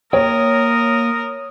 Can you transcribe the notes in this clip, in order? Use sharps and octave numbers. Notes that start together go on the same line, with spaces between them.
A#3 A#4 C#5 G5 D#6